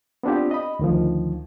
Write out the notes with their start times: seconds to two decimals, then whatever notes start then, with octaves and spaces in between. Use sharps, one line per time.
0.23 B3 C4 D4 F4 G4
0.51 D#5 B5
0.79 D2 D#3 F3